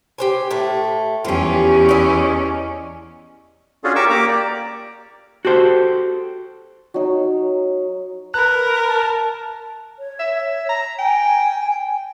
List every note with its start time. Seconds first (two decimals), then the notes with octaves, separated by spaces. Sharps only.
0.18 G4 C5 G#5
0.51 A2 A3
1.25 E2 C#4 F4 G4
1.89 D5 D#5
3.84 C#4 D4 F4 F#4 G#4 A4
3.96 G4 A#4 C#6 D6 E6
4.10 A#3 G4 A#5 D6
4.28 D5
5.45 F#4 G4 A4 C5
6.94 F#3 D#4
8.34 A#4 B4 F#6
8.87 A5
9.99 C#5
10.20 E5
10.69 A#5
10.99 G5 G#5